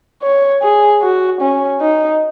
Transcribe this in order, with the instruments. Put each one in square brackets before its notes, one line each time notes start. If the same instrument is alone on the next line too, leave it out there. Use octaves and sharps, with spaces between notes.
[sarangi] C#5
G#4
F#4
C#4
D#4